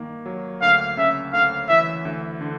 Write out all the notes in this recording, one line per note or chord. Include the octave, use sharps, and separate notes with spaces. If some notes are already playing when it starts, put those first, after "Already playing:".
Already playing: G2 D#3 A#3
F#3
D2 F5
C#3 E5
D2 F5
E3 E5
D2
D3